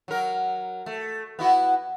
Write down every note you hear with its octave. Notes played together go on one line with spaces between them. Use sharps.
F#3 A#4
A3
B3 E4 F#4